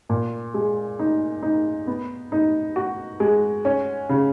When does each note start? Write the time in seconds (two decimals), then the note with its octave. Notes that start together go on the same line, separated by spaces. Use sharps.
0.09 A#2
0.54 G#3
0.99 D#4
1.43 D#4
1.87 B3
2.32 D#4
2.76 F#4
3.20 G#3
3.65 C#4
4.09 C#3